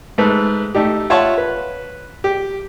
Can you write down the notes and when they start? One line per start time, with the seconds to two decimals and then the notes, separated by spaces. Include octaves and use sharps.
0.18 G#2 A3 B4
0.75 A3 D#4 G4
1.10 F4 C#5 E5 F#5 A5 C#6
1.38 B4
2.24 G4